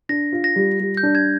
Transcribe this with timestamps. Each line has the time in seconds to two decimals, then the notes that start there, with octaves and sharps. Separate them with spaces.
0.09 D4 A#6
0.32 F4
0.44 A#6
0.56 G3
0.80 G3
0.97 G6
1.03 D4
1.15 G#6